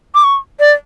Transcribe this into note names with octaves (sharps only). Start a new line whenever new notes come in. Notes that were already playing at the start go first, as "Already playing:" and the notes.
D6
C#6
D5